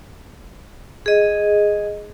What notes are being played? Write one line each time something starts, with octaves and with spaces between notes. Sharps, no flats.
G#4 D#5